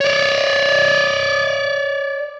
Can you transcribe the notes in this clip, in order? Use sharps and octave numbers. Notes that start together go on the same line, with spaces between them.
C#5 D5